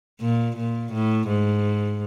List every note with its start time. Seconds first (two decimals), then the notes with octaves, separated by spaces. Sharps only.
0.21 A#2
0.57 A#2
0.93 A2
1.28 G#2